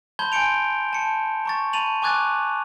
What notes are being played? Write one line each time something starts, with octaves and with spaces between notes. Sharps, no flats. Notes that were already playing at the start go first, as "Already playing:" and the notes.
A5 B5 C6 G6 G#6 G7
G#5 C6 G6 C#7 D7 F7
A5 C#7
A#5 C#6 A6
A5 B5 A6 D#7 F7 F#7
G#5 C#6 D6 F#6 G#6 A6